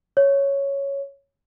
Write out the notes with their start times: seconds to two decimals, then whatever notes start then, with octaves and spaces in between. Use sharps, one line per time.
0.17 C#5